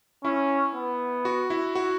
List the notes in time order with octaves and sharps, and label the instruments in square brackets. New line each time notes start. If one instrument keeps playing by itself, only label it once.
[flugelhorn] C#4 [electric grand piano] E4
[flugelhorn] B3
[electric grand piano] F#4
E4
F#4